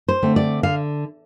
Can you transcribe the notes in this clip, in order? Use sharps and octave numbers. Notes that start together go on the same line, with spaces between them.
C5
D3 A3 C4
D5
D3 F5